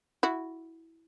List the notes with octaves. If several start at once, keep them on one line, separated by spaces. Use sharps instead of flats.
E4 F#4